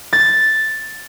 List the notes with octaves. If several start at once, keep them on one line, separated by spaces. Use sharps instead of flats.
A6